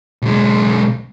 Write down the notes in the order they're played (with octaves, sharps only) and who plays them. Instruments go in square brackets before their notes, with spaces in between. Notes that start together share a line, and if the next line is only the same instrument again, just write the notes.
[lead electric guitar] B1 G#3